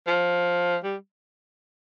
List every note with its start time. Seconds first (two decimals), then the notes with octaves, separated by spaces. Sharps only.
0.07 F3
0.84 G3